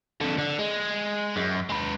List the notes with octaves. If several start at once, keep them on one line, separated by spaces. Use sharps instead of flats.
F2 D3
D3
G#3
F#2
G#3 B4